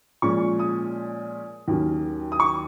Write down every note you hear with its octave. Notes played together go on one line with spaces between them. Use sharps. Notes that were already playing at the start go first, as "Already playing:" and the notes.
A#2 F3 G#3 C#4 C#6
D#6
D#2 D#3 F#3 A#3 C#4
D#6
C#6